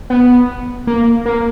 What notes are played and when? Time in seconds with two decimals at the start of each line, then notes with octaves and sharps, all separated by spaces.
0.10 B3
0.87 A#3
1.26 A#3